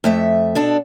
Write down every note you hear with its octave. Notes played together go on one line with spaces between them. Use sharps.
F2 A3 E5
B2 D4 A4